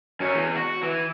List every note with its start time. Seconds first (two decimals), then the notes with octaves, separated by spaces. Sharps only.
0.20 F#2 C#4
0.35 E2
0.56 F#4
0.83 E3